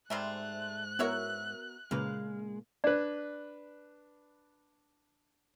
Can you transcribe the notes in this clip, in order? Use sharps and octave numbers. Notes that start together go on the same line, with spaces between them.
G#2 C3 G3 A3 E5 C6 F#6
B3 E4 F#4 A#4 C#5 E5
A#2 C#3 G#3 A#3 B4 F5
D4 B4 D5